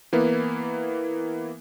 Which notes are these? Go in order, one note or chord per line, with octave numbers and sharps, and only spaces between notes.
E3 A#3 B3 E4